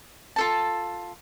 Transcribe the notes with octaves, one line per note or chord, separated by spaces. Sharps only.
F4 A4 A5